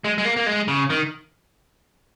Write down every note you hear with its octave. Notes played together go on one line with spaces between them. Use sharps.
G#3
G#3
A#3
A#3
G#3
C#3
D#3